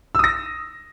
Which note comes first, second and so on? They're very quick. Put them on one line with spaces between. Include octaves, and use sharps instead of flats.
E6 D#6 A#6